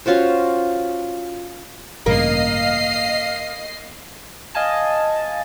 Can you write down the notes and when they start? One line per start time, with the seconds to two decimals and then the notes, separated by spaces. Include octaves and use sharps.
0.06 C#4 F4 F#4 C5
2.06 A1 G2 C#3 A#3 D#5 F5 C7
4.55 D#5 F5 G#5 A5